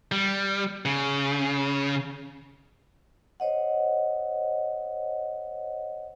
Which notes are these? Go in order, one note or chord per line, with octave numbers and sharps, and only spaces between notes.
G3
C#3
C5 C#5 D#5 F#5